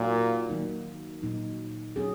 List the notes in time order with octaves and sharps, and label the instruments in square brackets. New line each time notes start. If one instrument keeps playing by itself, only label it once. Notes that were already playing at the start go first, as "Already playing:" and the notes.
Already playing: [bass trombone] A#2 [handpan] F#3 D#4 F#4 A#4
[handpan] D#3 F#3 A#3 D#4
A#2 F#3 D#4
F#3 C#4 G#4